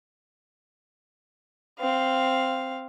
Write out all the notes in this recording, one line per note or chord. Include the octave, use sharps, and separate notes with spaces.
C4 F5